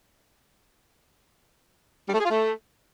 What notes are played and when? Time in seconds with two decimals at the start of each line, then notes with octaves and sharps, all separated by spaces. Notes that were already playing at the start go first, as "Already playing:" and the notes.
2.08 G3
2.14 A3
2.19 G#4
2.25 F4
2.30 A3